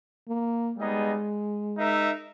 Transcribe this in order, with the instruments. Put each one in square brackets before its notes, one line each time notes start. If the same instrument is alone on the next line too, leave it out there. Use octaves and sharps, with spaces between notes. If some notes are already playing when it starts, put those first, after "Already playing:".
[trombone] A#3
[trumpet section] G3 B3 D#4 G#4 D#5 [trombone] G#3
[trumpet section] D#4 A#4 E5